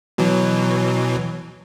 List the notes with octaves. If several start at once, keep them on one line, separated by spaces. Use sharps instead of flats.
B2 E3 F#3